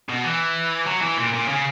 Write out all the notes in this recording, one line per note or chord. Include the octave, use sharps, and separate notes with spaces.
B2
E3
F#3
E3
A#2
A#2
C#3